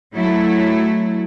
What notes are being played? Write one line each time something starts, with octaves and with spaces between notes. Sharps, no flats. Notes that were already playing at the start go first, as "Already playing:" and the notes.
F#3 A3 E4